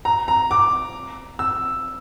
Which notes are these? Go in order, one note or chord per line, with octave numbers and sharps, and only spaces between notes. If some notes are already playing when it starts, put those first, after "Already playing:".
A#5
A#5
D6
E6